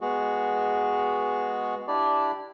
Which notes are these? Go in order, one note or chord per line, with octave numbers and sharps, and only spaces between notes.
G#3 B3 F#4 G#4
D4 E4 G4 D5